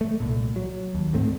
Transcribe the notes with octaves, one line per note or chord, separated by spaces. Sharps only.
A3
C2 A#2
F#3
D#2
D2 G#2 A3 C4